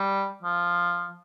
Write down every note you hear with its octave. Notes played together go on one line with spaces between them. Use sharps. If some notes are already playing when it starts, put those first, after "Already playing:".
Already playing: G3
F3